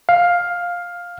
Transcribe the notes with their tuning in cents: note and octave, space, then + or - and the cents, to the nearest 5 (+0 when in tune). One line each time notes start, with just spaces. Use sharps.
F5 +10